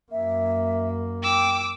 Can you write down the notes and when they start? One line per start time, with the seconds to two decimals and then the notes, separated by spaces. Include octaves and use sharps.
0.12 F#2 A#3 E5
1.23 G5 D6 E6